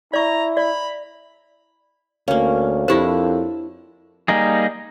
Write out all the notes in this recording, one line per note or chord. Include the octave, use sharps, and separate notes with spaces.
E4 D5 A#5 C#6
D5 B5
D2 A#3 C#4 A#4 C#5 F5
F2 D4 E4 F4 G4 C5 A5
G3 A#3 D#4 G#4